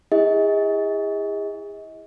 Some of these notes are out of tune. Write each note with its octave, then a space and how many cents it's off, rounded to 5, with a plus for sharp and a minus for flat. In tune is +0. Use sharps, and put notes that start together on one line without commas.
E4 -5 G#4 -35 D#5 +35